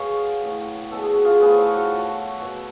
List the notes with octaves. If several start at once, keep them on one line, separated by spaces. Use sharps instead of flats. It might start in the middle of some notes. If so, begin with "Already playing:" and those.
Already playing: B2 G#3 B3 C#5 F5
A2 F#3 A3
B2 G#3 B3 A4
G#4
F#4
F4 G#4
A2 F3 A3 G#4 B4
A4 C#5
F#4 A4
B2 A3
B2 F#3 A3